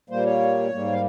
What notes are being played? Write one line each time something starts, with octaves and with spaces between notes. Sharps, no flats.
A#2 G3 A#3 C5
C#5
G#2 G3 A#3
F5